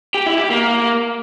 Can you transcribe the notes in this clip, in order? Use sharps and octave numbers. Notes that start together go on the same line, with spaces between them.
G4
E4
G4
A#3